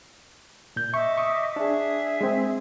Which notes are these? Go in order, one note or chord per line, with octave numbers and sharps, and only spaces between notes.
A#2 G6
D#5 E5 C#6 D6
C#6 D#6
D4 G#4 E5
G#3 C4